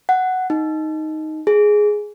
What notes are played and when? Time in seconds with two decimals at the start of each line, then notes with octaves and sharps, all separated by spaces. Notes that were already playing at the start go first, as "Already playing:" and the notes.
0.09 F#5
0.50 D#4
1.47 G#4